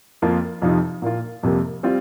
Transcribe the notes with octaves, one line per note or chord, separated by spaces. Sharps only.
F2 F3 A#3 F4
F2 C3 F3 D#4
A#2 A#3 F4
F2 C3 G3 A#3
G3 C4 F4